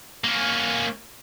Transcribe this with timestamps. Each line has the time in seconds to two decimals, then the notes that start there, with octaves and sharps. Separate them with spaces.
0.24 A#3 C#4